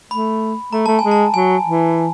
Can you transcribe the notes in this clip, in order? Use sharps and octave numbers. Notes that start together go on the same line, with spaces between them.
A3 B5
A3 A#5
A3 A5
G#5
G#3
A5
F#3 G#5
E3